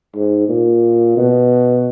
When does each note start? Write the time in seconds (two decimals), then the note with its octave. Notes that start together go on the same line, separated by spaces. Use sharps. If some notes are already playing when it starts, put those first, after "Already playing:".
0.15 G#2
0.49 A#2
1.17 B2